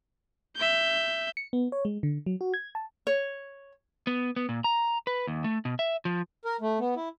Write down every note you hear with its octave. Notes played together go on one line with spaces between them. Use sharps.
E5 G6
C#7
B3
C#5
G#3
D3
F#3
F#4
G#6
A5
C#5
B3
B3
A#2
A#5
B4
D#2
A3
B2
E5
F3
A#4
A3
B3
E4